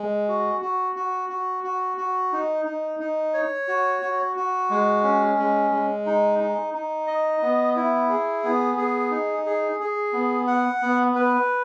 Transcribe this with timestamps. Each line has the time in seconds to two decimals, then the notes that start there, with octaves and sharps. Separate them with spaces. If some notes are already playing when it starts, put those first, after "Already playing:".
Already playing: G#3
0.29 F#4
0.61 F#4
0.96 F#4
1.29 F#4
1.64 F#4
1.97 F#4
2.33 D#4
2.65 D#4
3.00 D#4
3.34 C#5
3.68 F#4
4.02 F#4
4.36 F#4
4.70 G#3
5.04 C#4
5.38 G#3
5.71 G#3
6.06 D#4
6.39 D#4
6.74 D#4
7.07 D#5
7.42 B3
7.76 E4
8.09 G#4
8.44 B3
8.77 G#4
9.11 D#4
9.46 G#4
9.80 G#4
10.13 B3
10.47 F#5
10.82 B3
11.15 B4